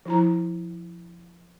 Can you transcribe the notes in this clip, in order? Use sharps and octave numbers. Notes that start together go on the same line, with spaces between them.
F3 E4 A#5